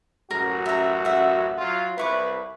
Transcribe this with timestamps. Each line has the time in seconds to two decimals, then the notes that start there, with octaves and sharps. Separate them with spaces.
0.31 A1 F#2 F#4 A#4
0.66 E5 A#5
1.05 E5 F#5
1.58 F#3 F4
1.98 C2 E4 B4 C#6 D6